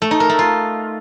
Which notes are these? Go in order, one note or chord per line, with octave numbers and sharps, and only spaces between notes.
A3
D#4
A#4
A3
F4